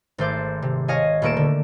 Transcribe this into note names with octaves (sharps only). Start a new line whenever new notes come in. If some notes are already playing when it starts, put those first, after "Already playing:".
G#1 A3 C5 D6
C3
C#5 D#5 F5 G#5
D#1 A3 A#3 C#6 D7 E7
D3